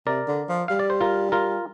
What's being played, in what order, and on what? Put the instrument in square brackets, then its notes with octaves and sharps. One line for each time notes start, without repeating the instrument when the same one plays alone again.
[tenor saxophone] C3 [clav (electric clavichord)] A#4 D5
[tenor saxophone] D3
F3
[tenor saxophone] G3 [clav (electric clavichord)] F5
[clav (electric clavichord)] D5
C5
F4 A#4
F4 A#4